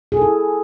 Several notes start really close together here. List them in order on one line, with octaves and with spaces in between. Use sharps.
G#4 A4 E4